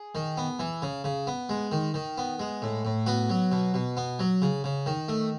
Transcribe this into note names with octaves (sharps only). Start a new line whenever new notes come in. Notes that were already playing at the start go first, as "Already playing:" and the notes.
Already playing: G#4
D#3
B3
E3
C#3
C#3
B3
G#3
D#3
D#3
B3
G#3
A2
A2
B3 F#4
F#3
B2
B2
B3
F#3
C#3
C#3
D#3
A3